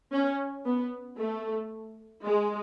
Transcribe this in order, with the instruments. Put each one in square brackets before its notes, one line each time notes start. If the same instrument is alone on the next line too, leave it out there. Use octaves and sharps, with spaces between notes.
[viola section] C#4
B3
A3
G#3